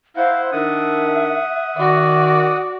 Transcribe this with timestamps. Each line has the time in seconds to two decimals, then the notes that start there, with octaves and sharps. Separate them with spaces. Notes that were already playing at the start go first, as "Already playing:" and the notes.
0.16 E4 C5 F5 F#5
0.52 D#3 D4 E5 F#5 D#6
1.77 D#3 F#4 D5